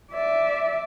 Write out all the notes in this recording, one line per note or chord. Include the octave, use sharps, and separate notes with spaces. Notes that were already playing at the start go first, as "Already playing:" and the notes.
D5 E5